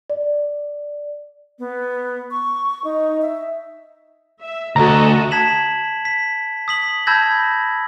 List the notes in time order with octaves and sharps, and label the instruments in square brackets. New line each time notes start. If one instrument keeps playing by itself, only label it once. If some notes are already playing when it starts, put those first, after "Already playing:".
[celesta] D5
[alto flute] B3
C#6
D#4
E5
[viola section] E5
[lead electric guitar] D2 [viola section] F#4 A4 D#5 [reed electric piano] A#5
[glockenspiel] A5 G#6 B6 E7 F#7
B6
D#6 B6 F#7
A5 B5 E6 G6 G#6 A#6